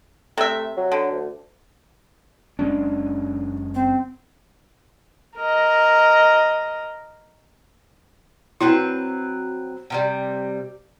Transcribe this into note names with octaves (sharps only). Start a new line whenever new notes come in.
C3 A3 E5
F#3
D3
D2
F#1 G#3 C#4 D4
C4
A#4 D#5
F#3 C4 E4 B4
C3 F3 G3